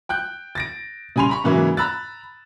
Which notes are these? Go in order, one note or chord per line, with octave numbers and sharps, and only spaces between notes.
G5 F#6 G6
A6 A#6 D7
C#3 G3 G#5 B5 C6 F7
A#5 B5 C#6
G#2 C#3 E3 F#3 A#3 E4
A#5 B5 E6 F#6 A6